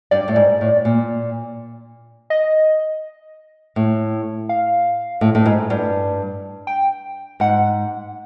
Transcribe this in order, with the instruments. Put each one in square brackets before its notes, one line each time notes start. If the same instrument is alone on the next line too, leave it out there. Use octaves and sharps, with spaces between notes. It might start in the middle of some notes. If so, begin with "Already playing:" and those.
[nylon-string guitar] G2 [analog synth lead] D5
[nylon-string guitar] A2
G#2
A2
A#2
[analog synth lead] D#5
[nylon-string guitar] A2
[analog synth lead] F5
[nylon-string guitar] A2
A2
G#2
G2
[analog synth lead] G5
[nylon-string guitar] G#2 [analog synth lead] F#5